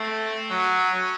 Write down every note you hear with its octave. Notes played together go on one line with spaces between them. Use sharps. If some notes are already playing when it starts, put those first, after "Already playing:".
Already playing: A3 C4
F#3 C#4